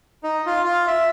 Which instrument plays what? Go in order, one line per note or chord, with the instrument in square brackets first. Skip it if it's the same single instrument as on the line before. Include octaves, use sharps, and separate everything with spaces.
[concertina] D#4
F4
F4
E5